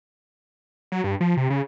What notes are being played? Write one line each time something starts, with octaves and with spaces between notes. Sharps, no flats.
F#3
G2
F3
C3
C#3